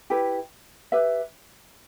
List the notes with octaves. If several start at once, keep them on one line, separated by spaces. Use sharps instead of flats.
E4 G4 B4
G4 B4 E5